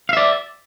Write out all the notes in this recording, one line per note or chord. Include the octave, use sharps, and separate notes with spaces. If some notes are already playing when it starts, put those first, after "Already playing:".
D5 E5 F5